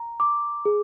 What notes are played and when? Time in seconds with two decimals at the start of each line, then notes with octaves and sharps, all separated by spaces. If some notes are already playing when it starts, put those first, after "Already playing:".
Already playing: A#5
0.20 D6
0.65 G#4